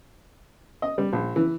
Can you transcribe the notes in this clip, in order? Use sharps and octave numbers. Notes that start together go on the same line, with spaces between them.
D#5
G3
A#1
E3